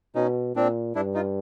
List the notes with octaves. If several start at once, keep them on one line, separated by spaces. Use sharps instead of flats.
B2 C#4 D#4
A#2 C4 D4
G2 D4 E4
D#4 F4